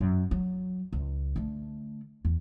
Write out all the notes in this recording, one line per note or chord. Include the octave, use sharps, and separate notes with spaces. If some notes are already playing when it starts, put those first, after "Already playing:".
F#2
F#3
C#2
D3 A3
E2